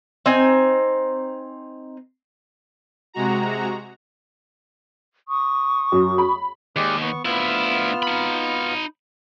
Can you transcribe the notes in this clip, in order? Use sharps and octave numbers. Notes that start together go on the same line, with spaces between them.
C4 D#4 G#5
C3 G#3 F#4 A#5
C#6 D#6
F#2
B5
D#2 G#3 G4 D5
B3 C#6
D2 B3 E4 F4 F6
D#4 B5